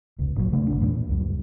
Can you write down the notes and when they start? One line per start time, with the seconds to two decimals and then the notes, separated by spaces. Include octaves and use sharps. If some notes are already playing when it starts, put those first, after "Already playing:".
0.19 E1 C#2
0.36 G#1 A#2 D#3 F#3
0.51 D1 C#3 A3 D4
0.68 G#1 C#2 C#3 D4
0.81 E2 A#2 F#3 A#3
1.09 C#2 F#2 G3